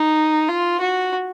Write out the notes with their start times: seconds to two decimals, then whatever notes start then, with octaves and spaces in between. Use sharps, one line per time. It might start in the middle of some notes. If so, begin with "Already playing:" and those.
Already playing: D#4
0.49 F4
0.81 F#4